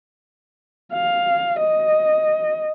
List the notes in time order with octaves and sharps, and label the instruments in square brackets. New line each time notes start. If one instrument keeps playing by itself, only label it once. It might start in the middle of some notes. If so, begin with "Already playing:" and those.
[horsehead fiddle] F5
D#5